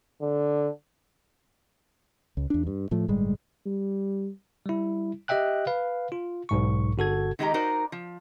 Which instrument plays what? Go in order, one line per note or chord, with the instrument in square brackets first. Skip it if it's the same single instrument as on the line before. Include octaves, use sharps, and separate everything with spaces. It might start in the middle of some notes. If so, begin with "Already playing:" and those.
[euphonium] D3
[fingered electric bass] C#2
E2 D4
G2
A2 F3 A3
G1 A2 G3 G#3
[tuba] G3
[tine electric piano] G3 E4
G4 D#5 E5 G5 F#6
B4 F5
F4
B1 G#2 C#6
G1 F#4 A4 G#6
[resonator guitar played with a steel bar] D#3 G#3 D#4 G4 A#5
D#4 F#4 A#4 C5 D5
F3